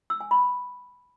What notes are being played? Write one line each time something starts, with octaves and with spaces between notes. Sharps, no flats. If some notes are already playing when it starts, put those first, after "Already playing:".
E6
G#5
B5